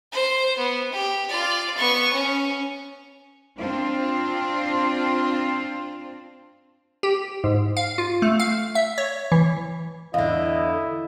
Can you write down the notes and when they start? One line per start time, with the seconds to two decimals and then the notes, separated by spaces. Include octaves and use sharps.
0.12 C5
0.57 B3
0.92 G4
1.29 F4 D5
1.77 B3 C#6
2.13 C#4
3.59 C4 D4 F4 C5
7.03 G4
7.44 G#2
7.77 F5
7.98 F4
8.22 A3
8.40 F5
8.75 E5
8.98 C#5
9.32 E3
10.14 E2 D3 E4 D#5 F5